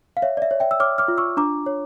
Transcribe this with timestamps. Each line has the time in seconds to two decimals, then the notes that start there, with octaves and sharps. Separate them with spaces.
0.17 F5
0.22 C#5 E5
0.37 D5
0.42 E5
0.51 C#5
0.60 E5 G5
0.71 E6
0.80 C#5 D6 F6
0.98 D6 F6
1.08 F4
1.17 C#6 E6
1.37 D4 A#5 D6
1.66 C#5